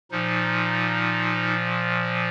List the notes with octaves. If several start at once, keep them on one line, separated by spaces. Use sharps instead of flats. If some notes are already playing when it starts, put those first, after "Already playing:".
A#2 F3 D#4